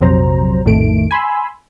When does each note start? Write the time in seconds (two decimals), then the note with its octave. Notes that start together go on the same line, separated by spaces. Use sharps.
0.01 A#1 F2 C3 F#3 C5 A#5
0.65 A#1 F2 A2 D#3 A3 D7
1.11 G#5 B5 C6 E6